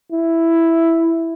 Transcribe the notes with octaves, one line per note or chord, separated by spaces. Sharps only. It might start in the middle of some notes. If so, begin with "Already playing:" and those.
E4